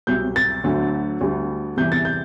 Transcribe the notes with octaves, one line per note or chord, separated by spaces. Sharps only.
C2 B2 F#3 G6
A6
D2 D3 F#3
D2 D3 G3
E2 C3 E3 G3 G6
A6
G6